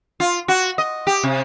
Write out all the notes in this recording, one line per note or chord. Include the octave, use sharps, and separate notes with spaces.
F4
F#4
D#5
G4
C3